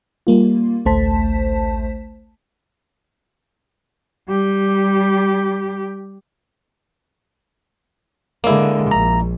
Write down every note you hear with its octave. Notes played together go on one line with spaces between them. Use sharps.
G3 A#3 F4
A1 D2 A3 C5 A5 B6
G3 G4
D3 G#3 A#3 E4
A#1 A#5